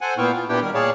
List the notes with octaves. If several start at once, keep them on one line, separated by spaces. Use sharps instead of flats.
A4 C5 F#5 G#5
A#2 B3 E4 F5 G5 C#6
F4
A#2 B3 D4 E4 G4 G5
D#3 G3 A#4
A#2 G#4 C#5 D5 F5 A5